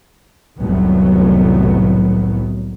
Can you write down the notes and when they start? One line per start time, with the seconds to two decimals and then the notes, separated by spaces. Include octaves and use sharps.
0.59 F1 C2 A2 D#3 F#3 B3